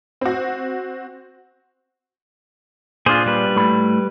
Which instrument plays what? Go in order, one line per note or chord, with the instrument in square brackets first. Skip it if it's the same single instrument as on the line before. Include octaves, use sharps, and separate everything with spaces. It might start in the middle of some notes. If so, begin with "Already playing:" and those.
[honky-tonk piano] C4 F#4
[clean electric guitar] A#2 D4 F4 [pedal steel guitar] G#4 C5
[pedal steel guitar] G3 B4
[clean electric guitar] A2 A3 B5